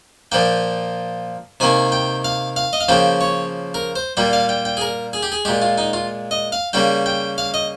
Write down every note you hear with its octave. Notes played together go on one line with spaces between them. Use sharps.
A#2 F3 A#3 G5
C3 D#3 A#3 G#5
G5
F5
F5
D#5
F5
C#3 F3 A#3 G5
C#5
A#4
C5
A#2 G3 A#3 G5
F5
G5
G5
G#4
A#4
G#4
G4
G#4
A#2 G#3 G4
F4
D#4
F4
D#5
F5
C#3 G3 A#3 G5
G5
F5
D#5